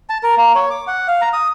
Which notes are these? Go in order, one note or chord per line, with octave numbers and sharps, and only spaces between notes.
A5
A#4
A#3
C#5
D6
F#5
F5
A#5
D#6